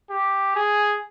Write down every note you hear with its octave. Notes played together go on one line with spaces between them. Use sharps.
G4
G#4